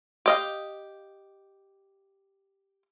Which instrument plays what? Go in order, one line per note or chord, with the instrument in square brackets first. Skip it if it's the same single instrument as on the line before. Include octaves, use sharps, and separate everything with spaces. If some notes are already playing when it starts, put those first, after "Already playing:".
[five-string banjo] G4 D#5 F5